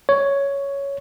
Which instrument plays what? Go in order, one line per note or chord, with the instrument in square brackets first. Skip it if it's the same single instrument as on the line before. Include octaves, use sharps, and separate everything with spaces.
[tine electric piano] C#5